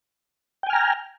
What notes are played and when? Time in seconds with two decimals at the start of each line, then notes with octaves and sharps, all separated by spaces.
0.63 G5
0.67 G#5
0.70 F6
0.73 A#5